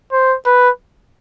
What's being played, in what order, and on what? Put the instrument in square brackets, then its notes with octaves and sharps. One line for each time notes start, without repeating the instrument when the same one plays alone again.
[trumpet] C5
B4